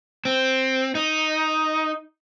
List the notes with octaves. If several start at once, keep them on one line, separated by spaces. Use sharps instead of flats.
C4
D#4